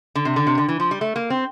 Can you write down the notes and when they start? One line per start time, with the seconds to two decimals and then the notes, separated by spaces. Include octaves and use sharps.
0.15 D3
0.25 C3
0.36 D3
0.47 C3
0.58 D3
0.68 E3
0.80 F3
0.91 G3
1.01 A3
1.16 A#3
1.30 C4